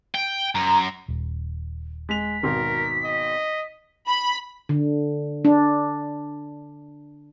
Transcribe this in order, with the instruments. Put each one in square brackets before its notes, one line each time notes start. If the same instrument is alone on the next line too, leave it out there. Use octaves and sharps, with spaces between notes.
[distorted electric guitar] G5
[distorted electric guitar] F#2 [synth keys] A#5
[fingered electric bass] D#1
[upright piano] G#3 F7 [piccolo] B6
[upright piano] G#1 B2 C6 [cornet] A#4
[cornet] D#5
[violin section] B5
[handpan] D3
D4